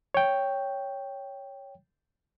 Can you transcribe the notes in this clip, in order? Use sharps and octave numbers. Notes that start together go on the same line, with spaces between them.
C#5 G5